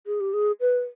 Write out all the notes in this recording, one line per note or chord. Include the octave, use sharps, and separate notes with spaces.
G#4
G4
G#4
B4